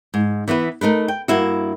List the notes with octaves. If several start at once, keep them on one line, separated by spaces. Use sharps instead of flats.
G#2
E3 B3 E4 B4
A3 D#4 A#4 B4
G5
G2 A#3 E4 F#4